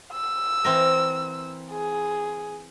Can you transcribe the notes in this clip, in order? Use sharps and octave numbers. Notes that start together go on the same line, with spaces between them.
E6
E3 C4 A#4
G#4